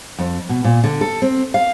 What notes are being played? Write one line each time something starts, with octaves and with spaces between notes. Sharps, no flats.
F2
B2
A#2
D3
A4
C4
F5